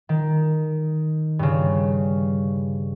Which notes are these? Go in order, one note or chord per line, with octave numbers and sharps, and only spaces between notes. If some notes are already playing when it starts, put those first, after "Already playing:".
D#3
G2 C#3